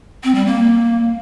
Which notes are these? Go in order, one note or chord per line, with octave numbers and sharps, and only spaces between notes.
C4
G3
A#3